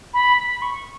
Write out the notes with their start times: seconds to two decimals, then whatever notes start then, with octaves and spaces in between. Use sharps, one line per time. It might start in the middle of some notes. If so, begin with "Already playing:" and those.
0.14 B5
0.37 B5
0.62 C#6